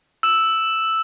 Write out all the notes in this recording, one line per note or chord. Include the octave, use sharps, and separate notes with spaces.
E6 E7